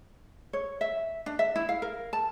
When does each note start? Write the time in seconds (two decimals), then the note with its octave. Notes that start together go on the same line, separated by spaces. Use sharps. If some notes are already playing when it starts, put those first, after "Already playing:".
0.53 C#5
0.81 E5
1.26 D4
1.39 E5
1.56 E4
1.69 F5
1.82 A#4
2.13 A5